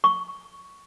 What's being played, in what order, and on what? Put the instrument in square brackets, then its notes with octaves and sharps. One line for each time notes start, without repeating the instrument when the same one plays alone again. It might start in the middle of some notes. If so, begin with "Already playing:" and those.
[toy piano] C#6